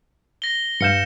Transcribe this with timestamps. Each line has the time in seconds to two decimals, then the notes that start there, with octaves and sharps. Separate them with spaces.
0.42 A#6 G7
0.81 G2 F5 G6 C#7 E7